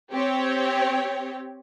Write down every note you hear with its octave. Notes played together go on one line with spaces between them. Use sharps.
C4 G4 C#5